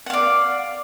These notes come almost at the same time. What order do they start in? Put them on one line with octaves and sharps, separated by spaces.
F#5 F5 D5